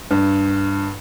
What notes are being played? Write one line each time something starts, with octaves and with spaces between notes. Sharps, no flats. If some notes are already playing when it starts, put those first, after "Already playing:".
G2